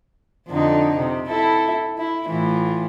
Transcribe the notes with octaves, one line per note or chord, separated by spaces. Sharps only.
F2 D3 D#4
C3
E4 A4
E4
A2 E3 F4